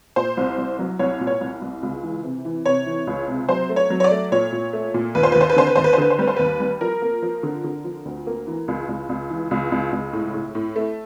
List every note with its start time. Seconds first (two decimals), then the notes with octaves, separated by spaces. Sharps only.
0.16 A#2 C5
0.37 C2
0.58 C2
0.79 F#3
0.99 C2 C#5
1.20 A#2
1.27 C#5
1.41 C2
1.62 C2
1.83 C#2
2.03 E3
2.24 C3
2.45 E3
2.65 C3 C#5
2.86 E3
3.07 C#2
3.28 C3
3.49 F#3 C5
3.69 A3
3.76 C#5
3.90 F#3
4.00 C#5
4.04 D5
4.11 A3
4.32 A#2 C#5
4.52 A#2
4.73 A3
4.94 A#2
5.15 D#2 B4
5.23 C5
5.32 D#2 B4
5.41 C5
5.50 B4
5.56 D3 C5
5.67 B4
5.76 D#2 C5
5.84 B4
5.93 C5
5.98 D3 B4
6.10 C5
6.19 G3 B4
6.27 C5
6.37 D#2 B4
6.60 G3
6.81 F3 A#4
7.02 A#3
7.22 F3
7.43 D3
7.64 D3
7.84 F3
8.05 D2
8.27 A#3
8.47 E3
8.68 C#2
8.89 C#2
9.09 C#2
9.30 E3
9.51 C#2
9.72 C#2
9.92 C#2
10.13 A2
10.34 A2
10.55 A2
10.76 A3